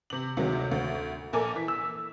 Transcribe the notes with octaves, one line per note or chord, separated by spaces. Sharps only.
C3 F#7
D2 C3 D#3 F#3 G#3
D2
A#1 A#3 A4 A#4 G#5 D6
E3 B6
E6